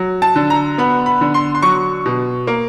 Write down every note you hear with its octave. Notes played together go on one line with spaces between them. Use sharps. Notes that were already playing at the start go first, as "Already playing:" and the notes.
Already playing: F#3
A5
D3
A#5
B3 B5
B5
D3
C6
C6
F#3 C#6
B2
A#3